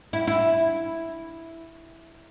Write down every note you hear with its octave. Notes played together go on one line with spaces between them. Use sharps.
E4
E4